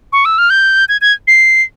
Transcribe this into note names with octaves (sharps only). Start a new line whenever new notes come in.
C#6
E6
F6
G6
G#6
G#6
C7